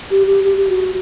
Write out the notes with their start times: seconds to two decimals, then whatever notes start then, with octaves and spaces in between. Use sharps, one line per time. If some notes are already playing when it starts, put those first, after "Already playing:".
0.11 G4
0.27 G4
0.44 G4
0.57 G4
0.69 F#4